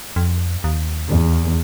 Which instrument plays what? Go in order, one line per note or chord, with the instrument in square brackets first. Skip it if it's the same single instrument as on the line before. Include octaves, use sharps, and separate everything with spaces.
[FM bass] F2
D#2
[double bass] E2